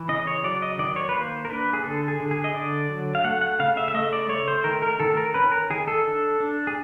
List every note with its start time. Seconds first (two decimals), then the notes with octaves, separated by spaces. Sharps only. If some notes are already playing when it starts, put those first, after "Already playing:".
Already playing: E3
0.09 C#3 D#5
0.27 C#5
0.44 F#3 D5
0.62 D#5
0.79 D#3 D5
0.96 C#5
1.09 B4
1.14 A#3 C5
1.45 A#4
1.49 D4 B4
1.73 G#4
1.84 D3 A4
2.08 G#4
2.20 D3
2.31 G#4
2.44 D#5
2.54 D3 D5
2.90 F#3
3.15 F5
3.24 A3 F#5
3.41 F#5
3.59 C#3 F5
3.77 E5
3.88 E5
3.94 A3 D#5
4.13 D5
4.29 A3 C#5
4.48 C5
4.64 D#3 A#4
4.82 A#4
5.00 D#3 A4
5.17 A#4
5.34 C#4 B4
5.52 A#4
5.70 D#3 G#4
5.88 A4
6.04 D4
6.40 D4
6.67 G#4